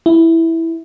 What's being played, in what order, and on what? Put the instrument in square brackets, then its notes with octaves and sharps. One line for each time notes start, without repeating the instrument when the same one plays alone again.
[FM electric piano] E4